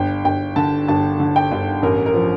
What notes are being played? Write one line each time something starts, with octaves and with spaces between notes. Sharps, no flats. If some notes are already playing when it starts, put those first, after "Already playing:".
Already playing: G1 G5
G1 G5
D3 A5
G1 A5
D3
G5
G1
A1 A#4
A#4
F3